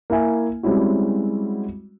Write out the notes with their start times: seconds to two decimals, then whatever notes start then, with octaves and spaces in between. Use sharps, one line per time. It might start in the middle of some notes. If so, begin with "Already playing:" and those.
0.10 A#3 E4 E5 G#5
0.63 G3 G#3 C4 C#4 E4 F#4